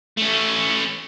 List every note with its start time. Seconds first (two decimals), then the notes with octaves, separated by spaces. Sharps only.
0.17 A3 C#4